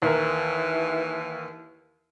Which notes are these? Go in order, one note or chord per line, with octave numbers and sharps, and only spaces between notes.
D#2 E3 A#4